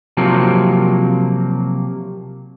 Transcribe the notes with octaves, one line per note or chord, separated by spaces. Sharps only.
C3 F3 F#3 A#3